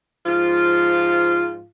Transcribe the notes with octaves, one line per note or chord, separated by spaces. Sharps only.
G#2 F3 F4